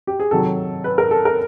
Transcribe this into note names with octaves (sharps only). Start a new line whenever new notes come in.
G4
G#4
C3 D#3 F#3 A4
B4
A#4
A4
A#4